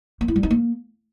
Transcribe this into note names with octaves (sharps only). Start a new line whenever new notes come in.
A#3
E4
G3
D#4
A#3